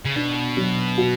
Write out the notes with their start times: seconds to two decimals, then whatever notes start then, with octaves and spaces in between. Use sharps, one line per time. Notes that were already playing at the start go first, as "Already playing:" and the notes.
0.05 C#3
0.16 B2 D4
0.57 F#3
0.98 F#4